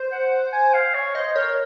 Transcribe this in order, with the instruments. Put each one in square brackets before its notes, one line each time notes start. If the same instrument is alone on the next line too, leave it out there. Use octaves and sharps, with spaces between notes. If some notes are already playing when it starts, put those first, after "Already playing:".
Already playing: [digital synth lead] C5
[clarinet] F#5
G#5
F5
C#5
[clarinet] C5 [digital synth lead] D#5
[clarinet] A#4 [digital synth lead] C#5